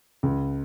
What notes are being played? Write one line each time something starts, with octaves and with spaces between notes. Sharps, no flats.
C#2 C#3